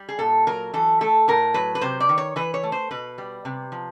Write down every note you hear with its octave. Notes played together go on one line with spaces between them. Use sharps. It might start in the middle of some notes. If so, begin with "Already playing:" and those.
Already playing: G3
G#4
A#2 A4
F#3 A#4
E3 A4
A3 A4
A2 A#4
F#3 B4
B4
C3 C5
D5
D#3
C#5
E3 B4
C#5
A3
C5
B2 B4
G3
C3
F3